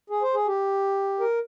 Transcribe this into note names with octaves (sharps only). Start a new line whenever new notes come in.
G#4
C5
G#4
G4
A#4